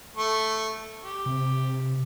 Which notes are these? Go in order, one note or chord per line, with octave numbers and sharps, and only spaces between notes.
A3
G4
C3